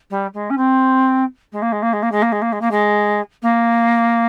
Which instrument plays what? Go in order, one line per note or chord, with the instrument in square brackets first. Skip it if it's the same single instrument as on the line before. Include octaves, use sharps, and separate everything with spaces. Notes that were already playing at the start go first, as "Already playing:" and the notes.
[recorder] G3
G#3
C#4
C4
G#3
A#3
G#3
A#3
G#3
A#3
G#3
A#3
G#3
A#3
G#3
A#3
G#3
A#3